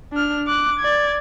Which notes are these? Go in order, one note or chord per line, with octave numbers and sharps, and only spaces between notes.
D4 F6
D6 F#6
D5 G#6